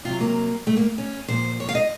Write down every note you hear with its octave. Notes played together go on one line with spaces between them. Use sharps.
C3 F#3 F4
A#3
A3
A#3
C#4
A#2 F3 C5
C#5
F5
D#5